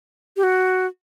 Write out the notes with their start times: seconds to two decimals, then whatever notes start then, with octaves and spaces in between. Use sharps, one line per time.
0.37 G4
0.43 F#4